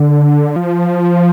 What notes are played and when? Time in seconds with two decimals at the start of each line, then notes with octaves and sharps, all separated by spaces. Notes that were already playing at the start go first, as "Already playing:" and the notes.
Already playing: D3
0.56 F3